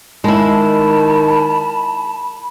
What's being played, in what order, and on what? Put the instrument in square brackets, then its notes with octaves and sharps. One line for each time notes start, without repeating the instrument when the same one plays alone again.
[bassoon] D#3 [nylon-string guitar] G#3 E4 [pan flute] A5 [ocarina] B5